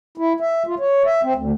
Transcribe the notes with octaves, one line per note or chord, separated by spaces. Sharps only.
E4
E5
F4
C#5
E5
C4
D2